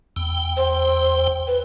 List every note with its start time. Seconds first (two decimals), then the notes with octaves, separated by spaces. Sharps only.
0.16 E2 G5
0.57 C5
1.47 B4